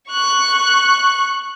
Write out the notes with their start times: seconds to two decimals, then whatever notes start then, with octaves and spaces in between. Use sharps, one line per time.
0.10 C#6 F#6